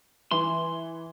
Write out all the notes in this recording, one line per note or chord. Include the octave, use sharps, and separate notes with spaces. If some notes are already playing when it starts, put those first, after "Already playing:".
E3 C6